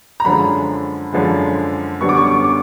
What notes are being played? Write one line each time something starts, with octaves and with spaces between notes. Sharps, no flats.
A#5
F#2 D3 F3 G#3 B5
F#2 D3 F3 G#3
F#2 D3 G3 B3 C#6
D6
C#6
D6
C#6
D6